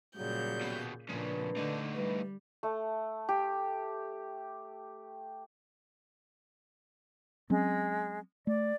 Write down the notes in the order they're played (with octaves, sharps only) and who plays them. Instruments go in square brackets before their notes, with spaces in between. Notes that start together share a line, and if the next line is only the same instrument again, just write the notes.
[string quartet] A#2 C#3 G6 [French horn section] F#3 G3
[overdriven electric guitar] D#2 B2
[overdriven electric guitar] F2 C#3 [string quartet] A#2 [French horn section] D4 B4
[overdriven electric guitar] A2 D#4 [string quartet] D3
[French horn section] G2 E3 B4 [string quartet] G3
[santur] A3
G4
[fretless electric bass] F#3 C4 C#4 [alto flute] G#3
[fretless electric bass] A3 [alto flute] D5